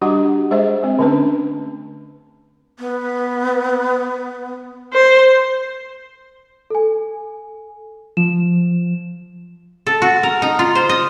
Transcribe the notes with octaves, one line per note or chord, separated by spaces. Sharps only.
G3 D4 F#4 G4 D#5 F#5
G#3 G#4 C5 D#5 E5
G#3 C4
D3 A3 C#4 D4 B4
B3
C5
A4 G#5
F3 E7
A4
F#4
A#4
D#4
F4
C5
D#5